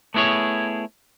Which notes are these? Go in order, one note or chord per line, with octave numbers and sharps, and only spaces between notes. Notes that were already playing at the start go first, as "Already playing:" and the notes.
A3 B3 E4 G#4 C#5